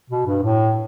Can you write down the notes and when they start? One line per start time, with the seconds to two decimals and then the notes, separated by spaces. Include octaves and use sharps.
0.10 B2
0.26 G2
0.43 A2